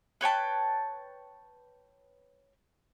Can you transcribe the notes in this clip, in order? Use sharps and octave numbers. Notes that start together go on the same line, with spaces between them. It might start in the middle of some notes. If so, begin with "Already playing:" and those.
B4 C#5 G5 A5